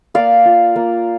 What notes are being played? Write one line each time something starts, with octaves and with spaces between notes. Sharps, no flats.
A#3 D5 F5
F4
A#3